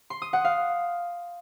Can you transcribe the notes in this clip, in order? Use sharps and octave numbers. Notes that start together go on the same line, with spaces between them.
C6
D#6
F#5
F5